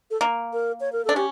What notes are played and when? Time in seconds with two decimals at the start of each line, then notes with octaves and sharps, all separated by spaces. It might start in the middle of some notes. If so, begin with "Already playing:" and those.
0.11 A4
0.21 A#3
0.53 A#4
0.80 C#5
0.92 A#4
1.05 D4 A4
1.16 C#4 G4